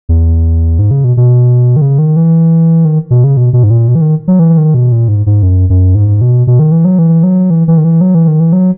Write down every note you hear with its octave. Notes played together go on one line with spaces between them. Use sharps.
E2
G#2
C#3
B2
B2
D#3
C#3
D#3
E3
D#3
B2
C#3
B2
B2
G#2
A#2
B2
E3
D#3
F#3
E3
D#3
B2
A#2
G#2
G#2
F#2
F#2
G#2
B2
B2
D#3
E3
F#3
E3
F#3
E3
E3
D#3
E3
F#3
E3
D#3
E3
F#3